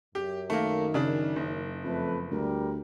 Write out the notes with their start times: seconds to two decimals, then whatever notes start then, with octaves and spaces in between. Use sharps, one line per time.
0.15 F#2 G4
0.50 D#3 A3 A#3
0.94 C#3 D4
1.36 F#1
1.84 F2 A3 B4
2.31 D2 G3 A#4